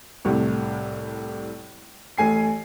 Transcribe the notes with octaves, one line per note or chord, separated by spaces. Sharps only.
C2 A2 C3
A1 A3 G#5 C7